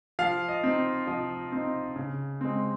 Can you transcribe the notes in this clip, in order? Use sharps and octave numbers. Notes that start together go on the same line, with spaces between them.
F3 F5
D#5
C4 D#4
F3 D#5
C4 D#4
C#3
G#3 C4